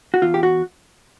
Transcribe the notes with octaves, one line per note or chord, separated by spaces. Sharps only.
F#4
E2 F4
G4
F#4